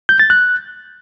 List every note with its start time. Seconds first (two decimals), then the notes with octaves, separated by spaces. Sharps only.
0.09 G6
0.20 A6
0.30 F#6